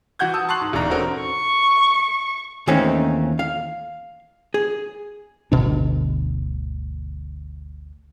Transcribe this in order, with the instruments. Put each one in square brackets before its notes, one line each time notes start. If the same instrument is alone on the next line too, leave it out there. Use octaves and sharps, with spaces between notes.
[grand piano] E3 F#4 F#5 G6 G#6
A5 D#6 E6
A5 C6 C#6 F#6 C7 F#7
G#2
D#1 E2 G#2 D4 A#5
C4 C#4 F#4 A4 A#4
[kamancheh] C#6
[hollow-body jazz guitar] D#2 E3 A3 C4 C#4 D#4
F5
G#4
[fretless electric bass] G1 D2 B2 D4